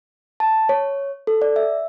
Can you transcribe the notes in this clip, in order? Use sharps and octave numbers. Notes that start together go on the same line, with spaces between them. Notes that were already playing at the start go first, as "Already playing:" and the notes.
A5
C#5
A4
D5
E5